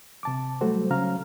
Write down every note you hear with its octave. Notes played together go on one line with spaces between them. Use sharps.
C3 A5 D6
F#3 G3 A3 F#4 A4 C5
C#3 F#3 C#4 F5 A#5 F6